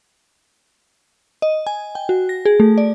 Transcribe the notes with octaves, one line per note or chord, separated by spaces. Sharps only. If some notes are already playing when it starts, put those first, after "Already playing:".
D#5
G#5
G5
F#4
A#6
G#4
A3
D5